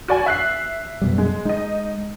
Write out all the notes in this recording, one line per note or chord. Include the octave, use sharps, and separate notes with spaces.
F#4 D5 G#5
E5 F#6 C7
F#2 B2 G3
G#3
G#3 D#4 D#5